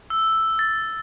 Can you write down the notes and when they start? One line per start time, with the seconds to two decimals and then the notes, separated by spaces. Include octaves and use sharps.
0.10 E6
0.59 A6